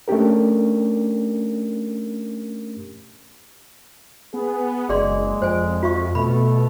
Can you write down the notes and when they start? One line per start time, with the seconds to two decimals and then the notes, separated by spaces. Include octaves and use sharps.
0.08 A3 C#4 D4 G4 A#4
4.34 B3 G#4
4.89 F#1 G#3 G#4 D5 C6
5.42 F2 C5 G#5
5.83 F4 E5 C#6
6.15 B2 A3 B5